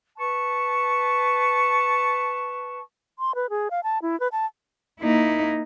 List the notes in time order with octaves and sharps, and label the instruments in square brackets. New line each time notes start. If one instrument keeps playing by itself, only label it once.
[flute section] B4 A5 C#6
[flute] C6
B4
G#4
F5
A5
E4
B4
A5
[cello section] A#3 [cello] D#4 E4